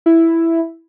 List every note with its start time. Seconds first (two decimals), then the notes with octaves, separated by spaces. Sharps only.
0.06 E4